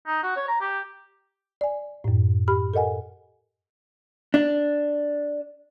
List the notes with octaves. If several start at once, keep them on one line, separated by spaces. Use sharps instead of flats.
D#4
F#4
C#5
A#5
G4
D5 G#5
F#2 A2
G4 B5 F6
A4 A#4 D#5 F#5 G#5
D4